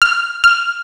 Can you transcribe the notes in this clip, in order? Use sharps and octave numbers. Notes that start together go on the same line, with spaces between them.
F6
F6